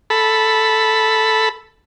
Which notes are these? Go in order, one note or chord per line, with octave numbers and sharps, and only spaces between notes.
A4 B5